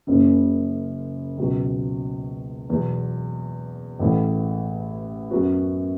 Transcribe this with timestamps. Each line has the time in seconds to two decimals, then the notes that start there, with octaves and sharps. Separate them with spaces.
0.07 F#1 F#2 C#3
1.38 C#2 B2 F#3
2.70 E2 B2 F#3
3.99 A1 A2 E3
5.30 F#2 F#3 B3 F#4